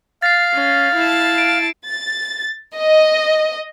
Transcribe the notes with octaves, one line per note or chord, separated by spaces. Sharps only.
F5 A6 A#6 C7
C#4
E4 A5
D7
A6
D#5